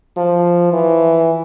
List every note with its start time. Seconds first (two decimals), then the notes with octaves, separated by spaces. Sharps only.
0.17 F3
0.72 E3